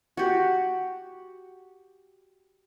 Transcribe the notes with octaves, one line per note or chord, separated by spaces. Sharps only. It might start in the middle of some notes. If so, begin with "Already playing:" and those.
F#4 G4